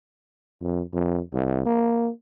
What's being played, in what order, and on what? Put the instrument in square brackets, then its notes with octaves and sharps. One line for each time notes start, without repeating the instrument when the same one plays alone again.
[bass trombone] F2
F2
C2
A#3